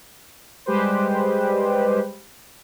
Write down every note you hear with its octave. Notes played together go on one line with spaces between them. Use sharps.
G3 G#3 G4 B4 C5